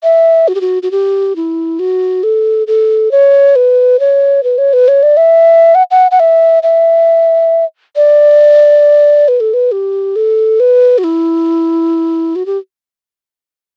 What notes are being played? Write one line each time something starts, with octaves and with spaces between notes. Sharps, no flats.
E5
F#4
G4
F#4
F#4
G4
E4
F#4
A4
A4
C#5
B4
C#5
B4
C#5
B4
C#5
D5
E5
F#5
F#5
F#5
E5
E5
D5
B4
A4
B4
G4
A4
B4
F#4
E4
F#4
G4